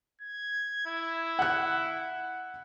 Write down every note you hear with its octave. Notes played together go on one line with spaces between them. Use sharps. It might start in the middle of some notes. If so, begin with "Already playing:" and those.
G#6
E4
F#5 F#6